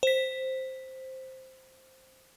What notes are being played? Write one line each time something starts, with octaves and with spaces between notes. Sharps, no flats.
C5 B6